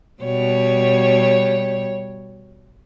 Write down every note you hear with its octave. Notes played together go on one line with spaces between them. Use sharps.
B2 G3 C#5